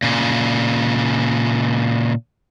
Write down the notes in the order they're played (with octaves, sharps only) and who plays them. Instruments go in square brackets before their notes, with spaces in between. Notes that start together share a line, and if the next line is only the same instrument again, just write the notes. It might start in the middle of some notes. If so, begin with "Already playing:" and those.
[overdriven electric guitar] A#2 C#3